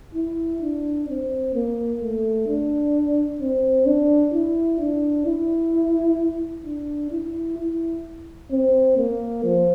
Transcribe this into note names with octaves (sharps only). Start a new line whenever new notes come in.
E4
D4
C4
A#3
A3
D4
C4
D4
E4
D4
E4
D4
E4
E4
C4
A#3
F3